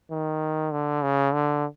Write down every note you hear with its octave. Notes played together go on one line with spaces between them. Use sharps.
D#3
D3
C#3
D3